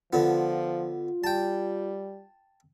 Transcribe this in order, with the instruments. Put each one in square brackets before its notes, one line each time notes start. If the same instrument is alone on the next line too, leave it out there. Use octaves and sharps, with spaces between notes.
[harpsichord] D3 B3 [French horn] F3 [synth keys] F4
[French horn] G3 [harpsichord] G5 A5